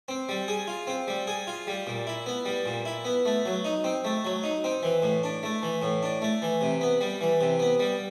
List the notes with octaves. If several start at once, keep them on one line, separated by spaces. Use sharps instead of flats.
C4
G3
G#4
F4
C4
G3
G#4
F4
G3
A#2
E4
B3
G3
A#2
E4
B3
A3
F#3
D#4
C4
A3
F#3
D#4
C4
E3
A2
D4
A3
E3
A2
D4
A3
E3
C3
B3
G3
E3
C3
B3
G3